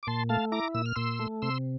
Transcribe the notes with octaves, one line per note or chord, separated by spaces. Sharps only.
D6
A#2 A5 C6
A3 F5 A5
E4 A#5 D6
A#2 E6
F6
A#2 C6 E6
A3
C3 C6 E6